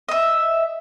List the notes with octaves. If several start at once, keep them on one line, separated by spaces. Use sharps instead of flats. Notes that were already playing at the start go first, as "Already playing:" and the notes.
D#5 E5